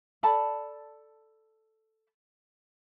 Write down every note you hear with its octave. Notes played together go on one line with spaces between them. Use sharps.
A4 D5 A5 B5